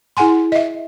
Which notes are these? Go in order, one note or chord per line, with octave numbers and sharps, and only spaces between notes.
E4 G#4 F#5 G#5 C6
D#5 E5